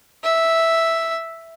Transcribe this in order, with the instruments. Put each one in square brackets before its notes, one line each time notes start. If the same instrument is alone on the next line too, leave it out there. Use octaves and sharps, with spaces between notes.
[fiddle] E5